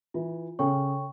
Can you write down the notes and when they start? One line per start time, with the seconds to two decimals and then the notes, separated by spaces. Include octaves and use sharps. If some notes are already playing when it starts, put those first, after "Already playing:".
0.14 E3 F4
0.59 C#3 A4 C#5 G5 C#6